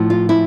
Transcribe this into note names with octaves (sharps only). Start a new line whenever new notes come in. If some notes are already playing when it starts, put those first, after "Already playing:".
Already playing: A2 F3
F4
E4